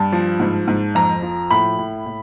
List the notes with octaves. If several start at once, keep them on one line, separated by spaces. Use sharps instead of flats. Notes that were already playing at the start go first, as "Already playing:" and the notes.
Already playing: G2 A5
F3
G#2
G#2
F2 A#5
F3
A2 B5
A2
A2